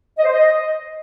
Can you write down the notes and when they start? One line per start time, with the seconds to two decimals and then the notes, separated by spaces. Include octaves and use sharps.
0.18 D#5
0.25 C5
0.31 D#5